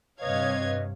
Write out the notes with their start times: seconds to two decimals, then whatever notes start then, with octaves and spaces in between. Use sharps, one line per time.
0.21 G2 C3 B4 C#5 D#5 F5 G#6